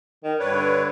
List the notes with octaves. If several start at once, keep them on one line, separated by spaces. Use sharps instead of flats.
D#3
G2 D4 B4 C#5
D3